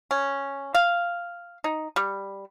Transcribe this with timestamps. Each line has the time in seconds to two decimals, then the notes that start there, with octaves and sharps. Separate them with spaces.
0.11 C#4
0.74 F5
1.64 D#4
1.96 G3